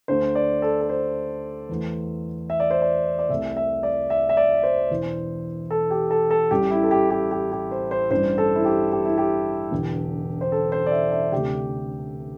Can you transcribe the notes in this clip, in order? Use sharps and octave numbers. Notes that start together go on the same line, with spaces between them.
D2 D3 A3 C5
D5
A4
A4
C5
E2 E3 A3
E5
D5
C5
D5
D5
C2 C3 A3 E5
E5
D5
E5
E5
D5
C5
E1 E2 E3
A4
G4
A4
A4
A1 A2 G3 G4
E4
A4
G4
G4
G4
G4
C5
C5
A1 G2 G3 C5
A4
E4
G4
G4
E4
G4
E1 E2 D3
C5
A4
C5
D5
E5
E5
D2 C3 A3 G4